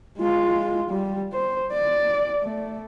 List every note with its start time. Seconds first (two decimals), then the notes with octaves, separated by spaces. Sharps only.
0.19 G#3 F4
0.90 G3
1.33 C5
1.72 D5
2.41 A3